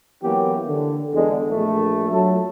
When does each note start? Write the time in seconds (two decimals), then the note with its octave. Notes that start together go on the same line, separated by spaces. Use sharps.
0.23 F#2 E3 A#3 B3 C#4 G4
0.68 D3
1.14 E2 D3 G#3
1.50 A#1 A3
2.11 F#3 A4